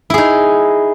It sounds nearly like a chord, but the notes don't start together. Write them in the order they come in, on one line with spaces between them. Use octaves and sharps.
E4 G#4 D#4